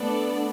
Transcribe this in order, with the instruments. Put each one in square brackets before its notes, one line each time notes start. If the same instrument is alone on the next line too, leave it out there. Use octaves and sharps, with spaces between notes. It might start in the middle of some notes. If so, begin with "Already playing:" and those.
Already playing: [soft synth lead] A3 [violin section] B3 D4 A4 D5